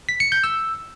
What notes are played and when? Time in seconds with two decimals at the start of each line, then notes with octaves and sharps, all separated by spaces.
0.09 B6
0.20 C#7
0.32 G6
0.44 E6